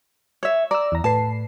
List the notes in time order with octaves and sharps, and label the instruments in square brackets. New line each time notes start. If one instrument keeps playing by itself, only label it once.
[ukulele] C#5 E5
[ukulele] D5 [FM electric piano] A#5 E6
[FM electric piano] E2 A#5
[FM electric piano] A2 B4 C7 [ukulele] A5